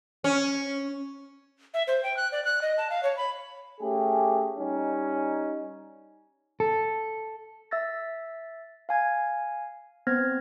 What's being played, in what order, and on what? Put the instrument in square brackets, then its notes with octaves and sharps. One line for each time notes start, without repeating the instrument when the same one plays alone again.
[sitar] C#4
[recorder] E5
C5
G5
F#6
D5
F#6
D#5
A5
F5
C#5
B5
[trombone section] A3 C#4 G4 G#4
G3 C#4 D#4
[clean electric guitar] A4
[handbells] E5 E6 A6 A#6
F5 G#5 G#6
B3 C4 C5 F6 G#6 A#6